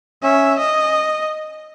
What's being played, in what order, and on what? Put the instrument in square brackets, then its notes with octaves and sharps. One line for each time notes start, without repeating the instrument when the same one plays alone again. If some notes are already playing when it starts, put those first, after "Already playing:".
[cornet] C#4 [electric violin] E5
[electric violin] D#5